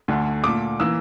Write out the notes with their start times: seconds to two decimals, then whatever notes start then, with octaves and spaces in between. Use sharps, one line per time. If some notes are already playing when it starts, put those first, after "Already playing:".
0.08 D2 D3 A3
0.44 A#2 A3 D6
0.80 E3 A#3 E6